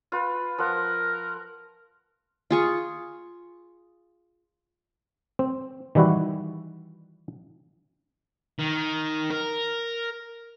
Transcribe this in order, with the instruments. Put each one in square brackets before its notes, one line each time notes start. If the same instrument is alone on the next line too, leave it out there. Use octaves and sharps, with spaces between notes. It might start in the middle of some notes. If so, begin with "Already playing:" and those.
[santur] F4 B4
[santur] F3 F#5 [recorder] A#4
[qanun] F4 G#4 C#6
[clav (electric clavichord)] C4
D#3 E3 G3 E4 F#4
[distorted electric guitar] D#3
A#4